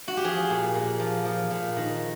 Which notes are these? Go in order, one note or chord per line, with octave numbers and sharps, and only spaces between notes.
F#4
G4
F3 G#4
A#2
A#2
F3
F3
A#2
D#3